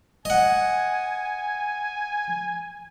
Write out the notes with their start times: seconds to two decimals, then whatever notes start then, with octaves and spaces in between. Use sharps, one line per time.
0.25 D#5 F#5 G#5